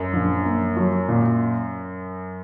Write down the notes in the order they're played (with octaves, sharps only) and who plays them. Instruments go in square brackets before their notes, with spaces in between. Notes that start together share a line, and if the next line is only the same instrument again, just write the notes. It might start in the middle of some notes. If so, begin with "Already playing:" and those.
Already playing: [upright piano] F#2
[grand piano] A#1
A#3
F#3
A#2